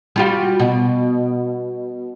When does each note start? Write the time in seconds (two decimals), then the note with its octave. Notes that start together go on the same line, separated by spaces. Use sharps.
0.16 G3 F4 F#4
0.60 B2